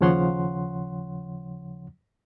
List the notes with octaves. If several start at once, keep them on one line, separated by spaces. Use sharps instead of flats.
D#2 C#3 F3 C#5 F#5 C6